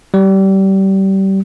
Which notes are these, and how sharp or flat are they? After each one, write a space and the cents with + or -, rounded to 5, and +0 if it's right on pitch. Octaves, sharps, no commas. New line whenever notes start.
G3 -25